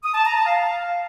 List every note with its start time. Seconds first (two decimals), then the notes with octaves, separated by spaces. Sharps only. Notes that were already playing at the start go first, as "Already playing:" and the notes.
0.04 D#6
0.15 A5
0.25 A#5
0.36 A5
0.46 F5